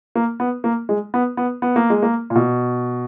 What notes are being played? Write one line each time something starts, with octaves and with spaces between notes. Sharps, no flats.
A#3
B3
A#3
G#3
B3
B3
B3
A#3
G#3
A#3
A#2
B2